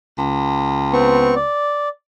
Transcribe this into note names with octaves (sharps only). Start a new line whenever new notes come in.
C#2
B3 C4 C#6
D5